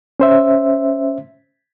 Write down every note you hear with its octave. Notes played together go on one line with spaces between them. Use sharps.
C#4 C5 E5